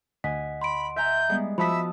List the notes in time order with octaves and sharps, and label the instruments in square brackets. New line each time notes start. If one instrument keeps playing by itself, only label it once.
[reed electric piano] D2 D#5 F#5 [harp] G#5 [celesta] B6
[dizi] B5 [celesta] C6 D7
[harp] E5 G#5 A#5 [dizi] G6
[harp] G3 G#3 B3
[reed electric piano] F3 E6 [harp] F#4 A5 D#6 [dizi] E5 [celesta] B5 B6